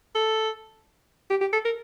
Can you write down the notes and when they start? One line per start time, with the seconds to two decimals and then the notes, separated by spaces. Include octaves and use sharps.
0.15 A4
1.30 G4
1.41 G4
1.53 A4
1.65 A#4